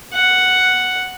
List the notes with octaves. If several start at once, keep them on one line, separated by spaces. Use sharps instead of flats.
F#5